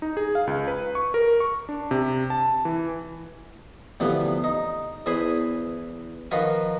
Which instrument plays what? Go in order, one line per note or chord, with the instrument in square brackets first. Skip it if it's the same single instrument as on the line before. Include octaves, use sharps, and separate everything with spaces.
[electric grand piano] D#4
G#4
F5
C#2
B4
C#6
A#4
C#6
D4
C3
A5
E3
[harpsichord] D2 C3 E3 F3 B3
D#4
E2 E3 C5 G#5 B5 D#6
D#3 F3 F4 F#4 A#4 B4